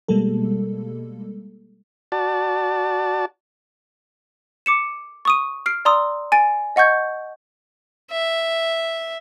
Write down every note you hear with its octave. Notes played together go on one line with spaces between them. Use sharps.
B2 G3 G#3 A#3 A4
F#4 D5 A5
D6 C#7 E7
C#6 D#6 D#7
F6 C7 D7
D5 A#5 C6 D#6 E6
G#5 A6 D7
D#5 F#5 C#6 G6 G#6
E5